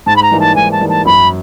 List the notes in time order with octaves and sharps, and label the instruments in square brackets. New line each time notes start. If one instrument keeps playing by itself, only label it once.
[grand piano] G#2 [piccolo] A5
[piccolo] B5
A#5
[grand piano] E3 G3 A#3 D#4
[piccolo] A5
[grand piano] G#2 [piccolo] G#5
[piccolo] A5
[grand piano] E3 G3 A#3 D#4
[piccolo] A5
[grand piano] F#2 [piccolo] B5